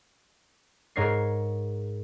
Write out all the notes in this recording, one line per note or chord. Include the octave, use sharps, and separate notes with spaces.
G#2 A#4 C#5 G#6 C7